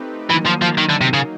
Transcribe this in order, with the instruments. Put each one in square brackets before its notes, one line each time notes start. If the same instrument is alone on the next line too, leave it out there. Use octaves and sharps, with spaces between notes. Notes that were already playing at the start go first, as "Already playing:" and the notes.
Already playing: [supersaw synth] A3 C4 D#4 G4 B4
[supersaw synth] D#3 F#3 A#3 D#4 [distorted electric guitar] E3
[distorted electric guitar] F3
F3
D#3
D3
C3
C#3